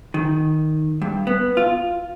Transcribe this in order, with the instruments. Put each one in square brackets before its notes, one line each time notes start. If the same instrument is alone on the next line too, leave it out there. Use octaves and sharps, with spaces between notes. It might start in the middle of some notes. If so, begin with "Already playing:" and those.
[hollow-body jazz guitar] D#3
G2
B3
F4